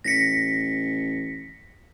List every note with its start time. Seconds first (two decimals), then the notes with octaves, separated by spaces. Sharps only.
0.04 A1 A#6 B6 C#7